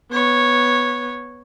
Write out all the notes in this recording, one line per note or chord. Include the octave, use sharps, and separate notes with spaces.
B3 C#5